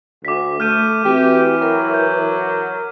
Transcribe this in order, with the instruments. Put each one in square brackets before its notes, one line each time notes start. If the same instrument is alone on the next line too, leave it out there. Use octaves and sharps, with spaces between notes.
[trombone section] D2 [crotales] D6 B6
[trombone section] A3 [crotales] F6 G6 D#7
[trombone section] E3 [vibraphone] C4 F#4 E5 [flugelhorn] G4
[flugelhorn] F#3 [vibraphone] A#4
[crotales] G6